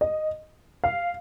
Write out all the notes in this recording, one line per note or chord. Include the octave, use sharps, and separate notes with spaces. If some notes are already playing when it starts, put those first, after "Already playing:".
D#5
F5